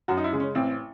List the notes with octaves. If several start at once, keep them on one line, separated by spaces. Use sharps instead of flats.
F#2 F#4
D#4
E4
C#3 G#3
C#4
A1 C4